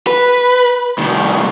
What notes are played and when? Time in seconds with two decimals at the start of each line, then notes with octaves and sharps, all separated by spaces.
0.07 B4
0.98 C2 D#3